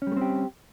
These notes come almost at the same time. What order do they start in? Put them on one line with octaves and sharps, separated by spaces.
C#4 G3 A3 C4 G4